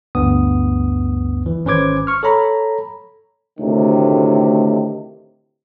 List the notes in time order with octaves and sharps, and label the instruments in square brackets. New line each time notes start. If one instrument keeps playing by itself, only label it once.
[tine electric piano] G1 D2 G2 B3 D#6
E3
G#1 C#4 B4 C5 D6 G#6
C#6 F6
A4 C#5 A#5 B5
[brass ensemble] D2 A2 C3 D#3